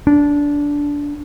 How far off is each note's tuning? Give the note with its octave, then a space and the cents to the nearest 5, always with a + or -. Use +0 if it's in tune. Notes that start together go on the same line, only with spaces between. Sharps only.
D4 -15